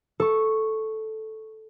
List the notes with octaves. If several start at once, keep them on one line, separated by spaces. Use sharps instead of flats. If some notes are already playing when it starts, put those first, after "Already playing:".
A4 C#6